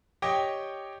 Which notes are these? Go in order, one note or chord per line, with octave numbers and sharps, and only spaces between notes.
G4 C#5 D#5 G5 D6